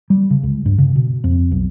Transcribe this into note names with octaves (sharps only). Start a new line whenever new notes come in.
G3
C#3
C#2
G2
C#3
B2
F2
B1